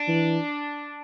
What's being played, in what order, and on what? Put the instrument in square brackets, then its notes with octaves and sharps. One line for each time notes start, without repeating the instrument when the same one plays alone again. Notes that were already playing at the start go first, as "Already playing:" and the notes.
Already playing: [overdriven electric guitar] D4
[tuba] E3